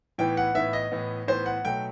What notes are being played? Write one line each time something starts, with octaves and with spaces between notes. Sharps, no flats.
A2 E3 B3 G5
F#5
A2 E3 B3 E5
D#5
A2 E3 B3
A2 E3 B3 C5
F#5
B2 F#3 A3 G5